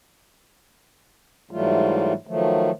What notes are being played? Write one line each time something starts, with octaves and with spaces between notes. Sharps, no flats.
G#2 E3 F#3 G3 A3 F4
D#3 F3 F#3 A3